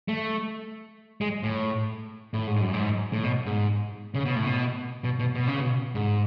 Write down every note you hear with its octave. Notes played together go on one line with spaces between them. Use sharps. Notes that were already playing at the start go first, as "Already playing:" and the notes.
A3
G#3
A2
A2
G#2
F#2
G#2
A2
B2
G#2
C#3
B2
A2
B2
B2
B2
B2
C#3
B2
G#2